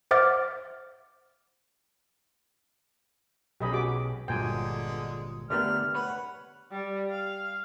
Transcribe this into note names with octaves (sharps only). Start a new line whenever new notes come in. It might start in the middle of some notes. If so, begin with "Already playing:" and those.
C5 E5 F#5 D6 F6 A6
B1 C#4 G4 D#5 B5
F#4 G#4 D6
G1 A#2 D3 F#3 G#3 G5 G#5
D3 A3 B3 G4 A#4 D5 F6
B4 C#5 F#5 B5
G3
F5